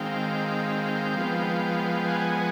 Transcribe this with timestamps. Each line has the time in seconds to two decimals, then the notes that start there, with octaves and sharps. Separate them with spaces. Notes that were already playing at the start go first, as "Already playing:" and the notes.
Already playing: D#3 G#3 C4 F5 G5
1.17 F3 G#3 B3
2.08 F#5 G#5